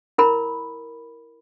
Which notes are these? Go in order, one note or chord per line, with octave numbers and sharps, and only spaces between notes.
E4 A#4 B5